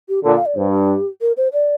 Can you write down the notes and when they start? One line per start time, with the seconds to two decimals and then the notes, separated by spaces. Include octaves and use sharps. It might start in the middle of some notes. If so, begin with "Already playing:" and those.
0.09 G4
0.24 A#2 D3 D5
0.36 F5
0.46 D5
0.56 G2 C5
0.73 G4
1.21 A#4
1.37 C5
1.53 D5